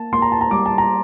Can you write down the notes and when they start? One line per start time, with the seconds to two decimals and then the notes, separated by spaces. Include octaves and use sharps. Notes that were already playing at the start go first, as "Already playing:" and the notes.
Already playing: A#3 A5
0.13 A#3 C6
0.22 A#5
0.32 A5
0.41 A#5
0.51 G3 D6
0.66 A5
0.78 A#5